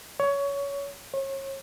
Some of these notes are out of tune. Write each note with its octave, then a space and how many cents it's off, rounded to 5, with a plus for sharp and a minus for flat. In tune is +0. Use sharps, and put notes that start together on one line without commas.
C#5 +20
C#5 -35